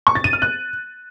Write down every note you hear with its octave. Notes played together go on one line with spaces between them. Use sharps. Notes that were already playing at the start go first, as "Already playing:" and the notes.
C#6
A6
D#7
F6
F#6